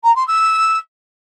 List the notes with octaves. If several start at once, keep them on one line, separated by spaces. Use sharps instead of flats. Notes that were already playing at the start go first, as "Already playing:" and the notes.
A#5
C6
E6